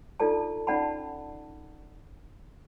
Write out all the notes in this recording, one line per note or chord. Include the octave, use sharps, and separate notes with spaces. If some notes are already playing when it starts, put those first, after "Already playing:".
D4 D#4 F4 A4 D5 A5
C#4 D#4 D5 F#5 A5 B5